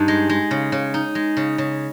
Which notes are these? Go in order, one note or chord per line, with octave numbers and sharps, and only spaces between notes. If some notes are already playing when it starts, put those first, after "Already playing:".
Already playing: G2 D#4
G#3
G#3
C#3
C#3
D#4
G#3
C#3
C#3